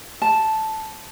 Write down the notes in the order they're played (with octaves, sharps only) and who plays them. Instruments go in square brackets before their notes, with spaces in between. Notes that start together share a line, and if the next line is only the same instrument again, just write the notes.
[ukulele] A5